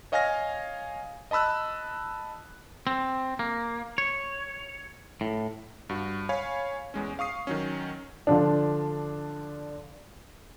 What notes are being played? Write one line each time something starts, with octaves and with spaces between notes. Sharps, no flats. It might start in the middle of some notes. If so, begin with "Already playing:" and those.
C#5 D#5 F5 G#5 F6 A#6
D#5 A5 B5 E6 F#6
C4
A#3
C#5
A2
G2 F#4
C#5 F5 G#5 B5
E2 G#3 C#4
F5 C#6 D#6 C7
D#3 F#3 C#4
D3 F3 D4